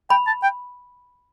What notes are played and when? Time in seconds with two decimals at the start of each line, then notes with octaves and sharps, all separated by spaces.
0.10 G5 B5
0.27 A5
0.43 G5